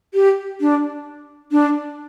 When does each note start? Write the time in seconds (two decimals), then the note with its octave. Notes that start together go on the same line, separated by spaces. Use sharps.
0.14 G4
0.61 D4
1.52 D4